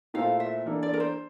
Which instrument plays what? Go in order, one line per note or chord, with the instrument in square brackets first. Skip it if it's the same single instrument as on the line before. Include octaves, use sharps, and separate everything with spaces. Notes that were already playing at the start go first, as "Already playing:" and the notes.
[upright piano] A#2 A3 E4 A4 C5 [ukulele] F5
[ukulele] E5
[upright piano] E3 A#3 D4 A4
[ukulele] D5
A#4
C5